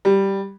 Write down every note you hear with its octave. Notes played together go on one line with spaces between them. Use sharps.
G3